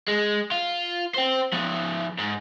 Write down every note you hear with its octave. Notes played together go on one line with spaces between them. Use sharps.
G#3
F4
C5 G5
F3 B3
G#2